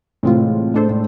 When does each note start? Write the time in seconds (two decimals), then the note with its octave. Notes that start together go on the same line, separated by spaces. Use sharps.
0.23 A2 C3 E3 G#3 C4 F4
0.74 A2 G#3 D4 A4 C5
0.89 A2